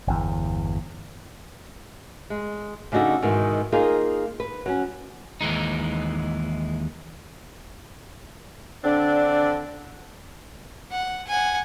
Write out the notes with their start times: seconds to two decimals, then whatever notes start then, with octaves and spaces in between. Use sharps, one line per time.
0.08 G1 E2
2.30 G#3
2.92 C#3 D4 D#4 F#4 A4
3.23 G#2 B2 D#3 E3
3.72 A#3 D#4 F4 G#4 A#4
4.40 B4
4.66 F#3 C#4
5.41 D#2 E3 G#3 D#4
8.84 D3 C4 D4
10.91 F#5
11.27 F#5 G#5